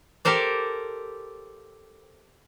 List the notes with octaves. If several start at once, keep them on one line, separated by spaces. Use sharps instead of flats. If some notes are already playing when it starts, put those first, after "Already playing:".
G4 A4 A#4 C5 D5